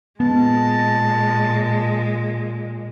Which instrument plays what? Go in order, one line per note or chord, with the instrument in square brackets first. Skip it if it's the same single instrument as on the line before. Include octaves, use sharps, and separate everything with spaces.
[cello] A#2 G#3 [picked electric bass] B3 [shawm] A5